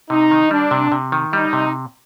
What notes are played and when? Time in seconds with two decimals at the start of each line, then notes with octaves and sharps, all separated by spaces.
0.10 C3 D#4
0.31 D#3
0.51 G3 D4
0.71 C3
0.92 C3
1.12 D#3
1.33 G3 D#4
1.53 C3